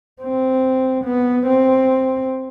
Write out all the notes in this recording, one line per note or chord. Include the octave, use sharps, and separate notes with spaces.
C4
B3
C4